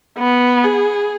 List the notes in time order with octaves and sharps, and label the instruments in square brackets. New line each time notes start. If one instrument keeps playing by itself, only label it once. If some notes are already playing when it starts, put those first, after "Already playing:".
[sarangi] B3
G#4